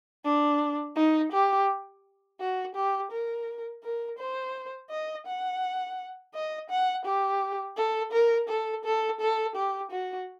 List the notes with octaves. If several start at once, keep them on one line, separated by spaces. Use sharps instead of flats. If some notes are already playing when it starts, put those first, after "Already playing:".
D4
D#4
G4
F#4
G4
A#4
A#4
C5
D#5
F#5
D#5
F#5
G4
A4
A#4
A4
A4
A4
G4
F#4